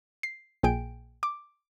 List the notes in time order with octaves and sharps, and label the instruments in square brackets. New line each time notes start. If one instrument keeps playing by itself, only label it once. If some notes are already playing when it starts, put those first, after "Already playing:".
[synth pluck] C7
A#1 A#2 G#4 G5 D7
D6